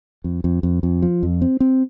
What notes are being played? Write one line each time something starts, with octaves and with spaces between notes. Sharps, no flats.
F2
F2
F2
F2
F3
F2
C4
C4